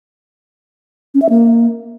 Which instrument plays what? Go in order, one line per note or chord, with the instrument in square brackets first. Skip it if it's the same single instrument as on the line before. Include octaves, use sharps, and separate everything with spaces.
[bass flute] C#4
E5
A#3